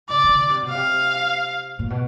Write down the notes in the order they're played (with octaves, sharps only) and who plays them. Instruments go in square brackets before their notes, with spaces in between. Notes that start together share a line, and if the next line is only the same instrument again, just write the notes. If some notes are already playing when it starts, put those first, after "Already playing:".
[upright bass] C#3 [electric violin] D5
[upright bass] C#3
D3
C3
B2
[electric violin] F5
[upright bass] C3
A#2
B2